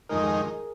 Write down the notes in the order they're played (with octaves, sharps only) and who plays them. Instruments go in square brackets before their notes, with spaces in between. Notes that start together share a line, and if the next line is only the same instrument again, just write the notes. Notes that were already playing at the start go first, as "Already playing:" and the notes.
[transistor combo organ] F2 D#3 G#3 D#4 [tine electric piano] A#4
[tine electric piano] G#4